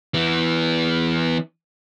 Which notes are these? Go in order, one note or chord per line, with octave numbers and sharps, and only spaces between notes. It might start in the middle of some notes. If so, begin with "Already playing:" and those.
E3 B3